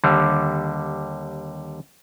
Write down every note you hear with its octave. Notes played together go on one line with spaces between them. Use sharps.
D#2 D3 G3